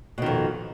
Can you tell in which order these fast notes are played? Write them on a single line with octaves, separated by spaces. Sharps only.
B2 D#3 F2